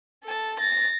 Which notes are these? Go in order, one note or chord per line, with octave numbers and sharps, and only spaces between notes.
A4 A5
A6 A#6